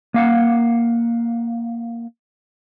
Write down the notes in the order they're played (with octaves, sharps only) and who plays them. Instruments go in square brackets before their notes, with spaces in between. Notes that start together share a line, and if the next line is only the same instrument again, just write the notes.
[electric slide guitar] A#3 F5 F#5